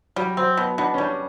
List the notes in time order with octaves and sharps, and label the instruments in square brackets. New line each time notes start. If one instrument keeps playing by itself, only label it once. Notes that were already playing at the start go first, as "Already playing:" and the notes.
[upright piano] F#3 [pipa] G3
[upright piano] F#3 [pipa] C4
[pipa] B2 [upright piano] B3
[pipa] B2 [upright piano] D4
[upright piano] C#4
[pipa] G3 [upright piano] D4